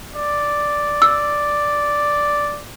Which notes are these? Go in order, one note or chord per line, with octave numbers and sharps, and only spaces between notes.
D5
E6